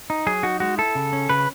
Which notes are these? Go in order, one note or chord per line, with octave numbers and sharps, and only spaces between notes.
D#4
F#3 G#4
D#4 F#4
G#3 F#4
E4 A4
C#3
C#4
C#3 B4